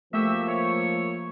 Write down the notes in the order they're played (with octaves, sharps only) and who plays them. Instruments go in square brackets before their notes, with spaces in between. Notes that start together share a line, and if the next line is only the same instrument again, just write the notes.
[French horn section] F3 A#3 [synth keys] A3 [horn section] F#4 G4 E5
[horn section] C#5